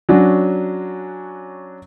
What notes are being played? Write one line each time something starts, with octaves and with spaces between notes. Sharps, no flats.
F#3 C#4 D4 F#4